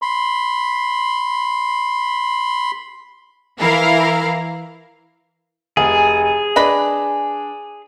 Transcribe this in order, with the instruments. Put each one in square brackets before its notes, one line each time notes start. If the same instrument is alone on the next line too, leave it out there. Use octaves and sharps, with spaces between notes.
[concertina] B5 C6
[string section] E3 E4 A#4 F5
[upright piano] F1 [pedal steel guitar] G#4
[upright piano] D4 [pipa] B4 D#5 B5